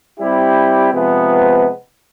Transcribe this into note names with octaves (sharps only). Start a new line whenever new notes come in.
G3 C4 E4 G4
C3 F3 G#3 B3